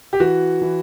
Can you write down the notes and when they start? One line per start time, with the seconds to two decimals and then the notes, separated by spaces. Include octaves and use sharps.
0.13 G4
0.20 E3 F#4
0.62 E3